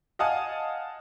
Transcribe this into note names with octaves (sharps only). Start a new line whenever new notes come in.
D#5 F5 F#5 G#5 A5 D#6